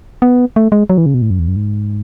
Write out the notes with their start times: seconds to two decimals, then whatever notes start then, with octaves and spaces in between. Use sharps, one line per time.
0.22 B3
0.56 A3
0.72 G#3
0.90 F#3
0.98 E3
1.06 C#3
1.14 B2
1.22 A2
1.31 F#2
1.39 E2
1.48 F#2
1.56 G#2